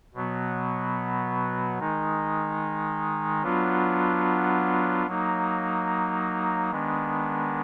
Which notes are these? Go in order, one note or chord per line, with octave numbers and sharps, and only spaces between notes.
B2 F#3 B3
D#3 G#3 D#4
F#3 B3 D4 F4
F#3 A#3 D#4
D#3 G#3 B3 D4